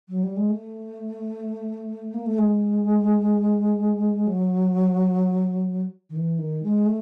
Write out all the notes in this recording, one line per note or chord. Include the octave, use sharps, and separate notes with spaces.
F#3
G3
G#3
A3
A#3
A3
G#3
F#3
D#3
E3
D#3
G#3
A3